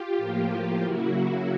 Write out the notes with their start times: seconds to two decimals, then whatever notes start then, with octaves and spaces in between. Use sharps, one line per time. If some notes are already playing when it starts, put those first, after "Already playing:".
Already playing: F4 G4
0.17 A2 F3 A#3
0.84 C#3 F#3 A#3 E4 F#4